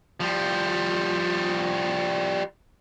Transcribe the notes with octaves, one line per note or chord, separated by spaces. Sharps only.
F3 G3